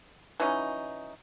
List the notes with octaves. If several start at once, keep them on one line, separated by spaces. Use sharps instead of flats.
E3 F#3 C#4 D#4